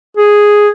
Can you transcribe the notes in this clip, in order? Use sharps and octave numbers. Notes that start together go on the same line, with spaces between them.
G#4